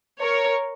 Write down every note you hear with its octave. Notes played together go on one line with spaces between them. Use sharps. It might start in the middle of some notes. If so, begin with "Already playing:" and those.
A#4 C#5